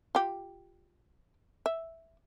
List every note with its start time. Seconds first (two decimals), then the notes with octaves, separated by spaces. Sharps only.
0.15 F4 G4
1.66 E5